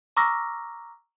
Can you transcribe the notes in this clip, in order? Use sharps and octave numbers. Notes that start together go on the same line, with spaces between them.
A#5 C#6 D6 E6 F6 A#6